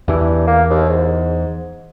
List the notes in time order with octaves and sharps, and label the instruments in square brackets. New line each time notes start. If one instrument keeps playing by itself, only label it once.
[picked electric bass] E2 E3 [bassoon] G2
[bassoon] A#3
D#2
G#2